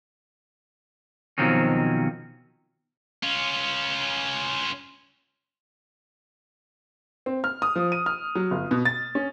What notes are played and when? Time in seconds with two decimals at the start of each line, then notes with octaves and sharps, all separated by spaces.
1.38 B2 D#3 F3 F#3 C4 C#4
3.23 C#4 F4
7.26 C4
7.44 F6
7.62 D#6
7.76 F3
7.92 D#7
8.06 F6
8.35 F#3
8.51 G1
8.71 B2
8.85 A6
9.15 C#4